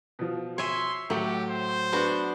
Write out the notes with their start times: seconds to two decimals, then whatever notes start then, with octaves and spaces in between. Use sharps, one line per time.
0.19 B2 F3
0.58 C#5 E5 G#5 C6
1.10 A2 F#3 A3 G4
1.49 C5
1.93 B3 D4 F#4